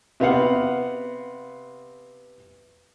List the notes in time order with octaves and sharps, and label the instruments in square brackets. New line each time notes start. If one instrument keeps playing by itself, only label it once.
[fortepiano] C3 B3 F5 F#5